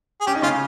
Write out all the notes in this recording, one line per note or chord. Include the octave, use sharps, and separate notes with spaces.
G#4
C#4 G4
D#4
C#3 C#4 F4